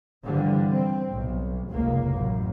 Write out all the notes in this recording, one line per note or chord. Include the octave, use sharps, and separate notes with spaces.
G2 D3 E3 F3 G3
C4
B1
F1 C#2 A#3
A1 F#2